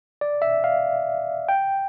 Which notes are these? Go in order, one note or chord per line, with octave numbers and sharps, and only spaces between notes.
D5
E5
F5
G5